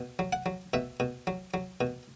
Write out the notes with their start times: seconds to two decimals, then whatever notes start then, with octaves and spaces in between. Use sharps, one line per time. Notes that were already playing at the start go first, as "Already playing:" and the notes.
Already playing: B2
0.19 F#3
0.33 F#5
0.46 F#3
0.74 B2 E5
1.00 B2
1.27 F#3
1.54 F#3
1.81 B2